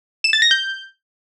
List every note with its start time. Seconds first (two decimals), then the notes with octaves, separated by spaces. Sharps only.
0.24 E7
0.33 A6
0.42 A#6
0.51 G6